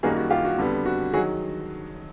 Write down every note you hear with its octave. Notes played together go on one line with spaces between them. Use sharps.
F#2 D#3 G3 A#3 F#4 G#4
F#4
F4 G4
F#4
F2 D3 G3 B3
F#4
D#3 F#3 F#4 G#4